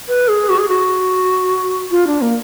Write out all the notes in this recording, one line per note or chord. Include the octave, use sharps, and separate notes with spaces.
B4
G#4
F#4
G#4
F#4
F4
D4
A#3